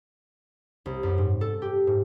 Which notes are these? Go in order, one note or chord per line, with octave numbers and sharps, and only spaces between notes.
C2
F#2
G#2
A4
G4
G#2